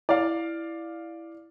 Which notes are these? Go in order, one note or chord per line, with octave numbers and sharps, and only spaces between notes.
E4 D5 F5